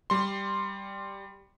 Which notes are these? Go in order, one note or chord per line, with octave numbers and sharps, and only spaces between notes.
G3 C6